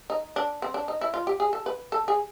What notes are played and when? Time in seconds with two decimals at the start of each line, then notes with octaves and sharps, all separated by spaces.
0.10 D#4
0.36 D4
0.62 C4
0.74 D4
0.88 D#4
1.01 E4
1.14 F4
1.27 G4
1.40 G#4
1.53 A4
1.66 B4
1.92 A4
2.08 G#4